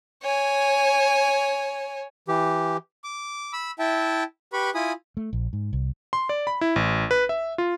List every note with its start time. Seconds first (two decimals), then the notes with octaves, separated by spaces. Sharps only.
0.23 C#5 G#5
2.28 E3 G4
3.04 D6
3.53 B5 E6
3.79 E4 E5 G5 A5
4.53 G4 B4 B5 C#6
4.75 E4 F4 G#5 B5 D#6
5.17 A3
5.33 A#1
5.53 G#2
5.73 C2
6.13 C6
6.29 D5
6.47 B5
6.61 E4
6.76 A1
7.11 B4
7.29 E5
7.58 F4